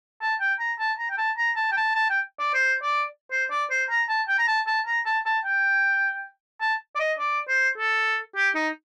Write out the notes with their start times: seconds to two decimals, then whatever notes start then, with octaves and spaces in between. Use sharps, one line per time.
0.21 A5
0.40 G5
0.60 A#5
0.79 A5
0.99 A#5
1.10 G5
1.18 A5
1.37 A#5
1.56 A5
1.72 G5
1.77 A5
1.95 A5
2.10 G5
2.40 D5
2.54 C5
2.83 D5
3.31 C5
3.51 D5
3.71 C5
3.90 A#5
4.09 A5
4.28 G5
4.39 A#5
4.48 A5
4.67 A5
4.87 A#5
5.06 A5
5.26 A5
5.45 G5
6.61 A5
6.95 D5
7.00 D#5
7.19 D5
7.48 C5
7.78 A4
8.36 G4
8.55 D#4